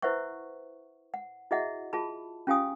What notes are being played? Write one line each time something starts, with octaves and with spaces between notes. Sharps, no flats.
E4 B4 C5 E5 F#5 C#6
F#5
E4 F#4 G#4 D#5 E5 F#5
F4 G#4 A5 B5
C#4 F4 G4 F5 G#5 D#6